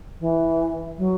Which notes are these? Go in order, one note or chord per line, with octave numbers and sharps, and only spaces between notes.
E3
F#3